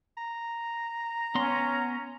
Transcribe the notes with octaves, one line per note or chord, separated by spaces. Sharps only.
A#5
B3 C#4 F#5 C6